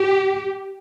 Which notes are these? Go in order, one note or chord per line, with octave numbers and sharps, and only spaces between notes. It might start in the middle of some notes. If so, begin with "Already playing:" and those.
Already playing: G4